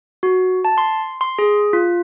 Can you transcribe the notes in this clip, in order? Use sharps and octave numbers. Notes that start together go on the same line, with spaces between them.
F#4
A5
C6
C6
G#4
F4